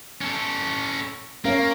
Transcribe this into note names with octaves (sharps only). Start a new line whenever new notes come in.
C#4 A4
A#3 C#4 A#4 F5